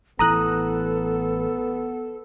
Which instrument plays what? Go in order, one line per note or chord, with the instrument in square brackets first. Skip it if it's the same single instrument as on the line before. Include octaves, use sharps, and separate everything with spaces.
[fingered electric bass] A1 E3 [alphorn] B3 [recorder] A4 [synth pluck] A#5 D#6 F#6